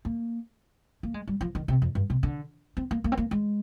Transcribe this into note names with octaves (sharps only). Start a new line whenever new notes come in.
A#3
A#3
G#3
G3
F3
D#3
C3
F2
G2
C3
D3
C4
A#3
A#3
C4
A#3
G#3